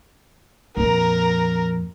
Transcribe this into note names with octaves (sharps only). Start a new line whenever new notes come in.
F2 A#2 A#4 A#5